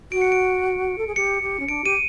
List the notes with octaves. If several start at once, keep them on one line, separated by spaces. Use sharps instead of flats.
F#4 D7
C#7
D7
A4
G#4
G4 C#7
G4
C#4
D4 D7
G4 D#7